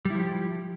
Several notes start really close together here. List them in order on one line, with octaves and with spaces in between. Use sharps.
G3 E4 F3 G4